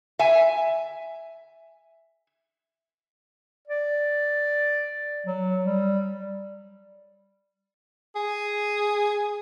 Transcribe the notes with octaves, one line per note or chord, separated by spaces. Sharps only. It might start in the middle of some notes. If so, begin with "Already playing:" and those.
E5 G#5
D5
F#3
G3
G#4